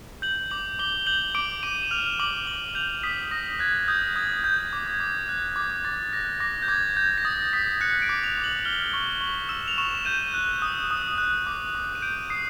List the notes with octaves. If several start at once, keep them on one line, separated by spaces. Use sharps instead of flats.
G6 F#7
D6 F#7
D6 G7
G6 F#7
D6 D7
D6 D#7
E7
F6 F7
D6 F#7
D6 F#7
F#7
G6 F7
D#6 B6
D#6 A#6
F#6 G#6
D#6 G6
D#6 G#6
G6
D6
G#6
D6
F#6 G#6
D6 G#6
D6 A6
F#6 A#6
D6 A#6
G6
D6 G#6
G6 G#6
A#6
D#6 A6
D#6 B6
F#6 C#7
D7
D6
F7
D6
F#7
F6 G7
C#6 G7
C#6 F#7
E6 E7
F7
C#6 E7
G6 D#7
F#6
D#6
D#6
F#6
D6
D6
D#7
G6 D7
D#6 C7